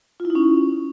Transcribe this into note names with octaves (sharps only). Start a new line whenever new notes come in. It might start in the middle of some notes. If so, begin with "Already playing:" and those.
F4
E4
D#4
C#4